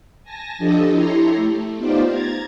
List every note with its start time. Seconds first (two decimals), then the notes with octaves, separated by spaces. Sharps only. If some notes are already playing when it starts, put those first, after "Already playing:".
0.23 G#5 A5 A#6
0.58 F3 D4 G4 A4 D#5
0.91 E4 G4 A4 C#5 A#5 C6
1.35 A3
1.77 B3 D#4 F4 G4 C5 D5
2.07 A#5 G#6 A6